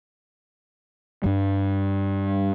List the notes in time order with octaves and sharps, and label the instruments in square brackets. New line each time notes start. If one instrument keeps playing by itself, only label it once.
[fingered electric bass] G2 G3